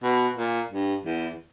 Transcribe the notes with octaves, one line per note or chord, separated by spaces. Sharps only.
B2
A#2
G2
E2